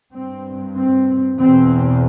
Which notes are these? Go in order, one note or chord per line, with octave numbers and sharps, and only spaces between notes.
G2 C4
C4
E2 B2 C4